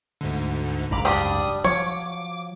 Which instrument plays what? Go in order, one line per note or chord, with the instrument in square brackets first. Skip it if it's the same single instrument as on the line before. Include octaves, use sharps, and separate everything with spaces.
[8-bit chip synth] D2 G#2 D3
[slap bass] F#1 C#2 G#2 [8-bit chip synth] A#5 B5 D6
[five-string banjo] G3 D4 G4 [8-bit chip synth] D#6
[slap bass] F3 F#3 [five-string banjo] C#5 [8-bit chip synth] D6